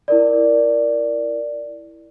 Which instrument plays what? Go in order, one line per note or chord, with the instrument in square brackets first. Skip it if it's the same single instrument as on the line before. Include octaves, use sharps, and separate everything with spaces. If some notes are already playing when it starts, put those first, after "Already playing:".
[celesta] E4 A#4 D5